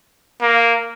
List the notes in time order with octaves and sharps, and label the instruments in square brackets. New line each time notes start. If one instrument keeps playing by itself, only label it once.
[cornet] A#3